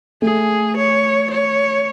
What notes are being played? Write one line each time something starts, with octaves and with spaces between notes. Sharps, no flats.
A3 G#4
C#5
C#5